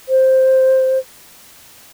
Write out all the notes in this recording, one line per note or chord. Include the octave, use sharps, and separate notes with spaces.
C5